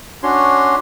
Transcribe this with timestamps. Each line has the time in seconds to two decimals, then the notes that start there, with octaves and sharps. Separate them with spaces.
0.23 C#4 D4 F#4 C#5 C6